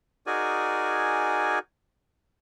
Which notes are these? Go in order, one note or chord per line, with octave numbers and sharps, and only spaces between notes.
D#4 F#4 G#4 A#4 D5 G#5